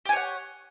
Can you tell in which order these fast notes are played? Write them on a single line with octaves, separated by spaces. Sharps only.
G4 G#5 C#5 F#5